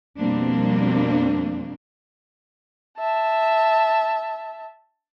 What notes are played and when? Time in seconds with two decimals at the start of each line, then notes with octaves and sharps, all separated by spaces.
0.18 F2 B2 G3 A#3 C4 D4
2.98 E5 A5